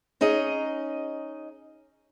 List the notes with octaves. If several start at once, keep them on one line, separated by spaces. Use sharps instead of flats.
C#4 D#4 G#4 D#5